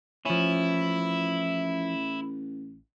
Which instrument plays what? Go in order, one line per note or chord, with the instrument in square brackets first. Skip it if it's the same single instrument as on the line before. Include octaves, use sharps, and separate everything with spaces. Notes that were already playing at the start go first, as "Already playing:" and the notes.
[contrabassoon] A1 [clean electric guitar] F3 C#4 [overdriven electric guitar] E4